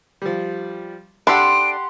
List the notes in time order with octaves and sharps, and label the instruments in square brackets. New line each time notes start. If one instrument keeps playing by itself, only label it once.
[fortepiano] F3 G3
[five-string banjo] D4 A4 [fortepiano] G4 F#5 [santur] C6 [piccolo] D7